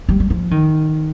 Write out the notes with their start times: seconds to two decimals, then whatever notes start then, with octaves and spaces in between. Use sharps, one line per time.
0.09 G3
0.20 G3
0.30 F3
0.51 D#3